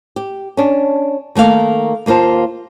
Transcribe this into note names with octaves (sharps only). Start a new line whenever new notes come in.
G4
C#4 D4
D#3 A3 A#3 F5
D#2 A#3 F4 C5 A5